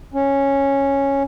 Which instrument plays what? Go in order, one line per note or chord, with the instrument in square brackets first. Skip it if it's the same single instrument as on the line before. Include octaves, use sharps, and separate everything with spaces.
[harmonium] C#4